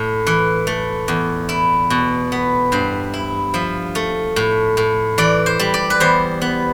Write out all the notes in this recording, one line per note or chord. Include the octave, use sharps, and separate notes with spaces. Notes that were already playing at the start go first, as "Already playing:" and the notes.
Already playing: A2
E3
A3
E2
E4
B2
B3
G2 C5
E4
F3 E5
A3
A2
A2
E3 D5
C5
G3
D5
B4
E2 C5
B3